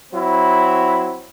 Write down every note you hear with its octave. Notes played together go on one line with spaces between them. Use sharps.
F#3 C4 E4